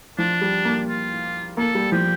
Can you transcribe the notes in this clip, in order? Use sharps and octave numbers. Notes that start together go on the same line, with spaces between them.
F3 D4
G3
A#3
F4
A#3 A4
G3
F3 G4